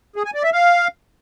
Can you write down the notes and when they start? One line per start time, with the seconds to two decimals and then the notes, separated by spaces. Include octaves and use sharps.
0.16 G#4
0.25 G#5
0.34 D5
0.43 E5
0.53 F5